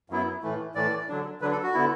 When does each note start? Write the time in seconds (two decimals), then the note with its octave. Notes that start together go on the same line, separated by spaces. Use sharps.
0.10 F#2 F#3 B3 E4
0.43 A2 E3 A3
0.75 A2 E3 A3 D5
1.08 D3 F#3 D4
1.41 D3 F#3 D4 B4
1.52 A4
1.63 F#4
1.74 D3 B3 E4